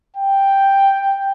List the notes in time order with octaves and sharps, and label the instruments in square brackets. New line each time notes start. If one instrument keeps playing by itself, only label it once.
[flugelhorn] G5